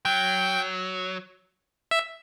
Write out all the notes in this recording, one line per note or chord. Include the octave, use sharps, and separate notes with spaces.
F#3 G5
E5